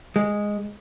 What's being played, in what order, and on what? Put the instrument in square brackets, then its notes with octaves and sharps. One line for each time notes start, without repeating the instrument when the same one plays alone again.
[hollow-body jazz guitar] G#3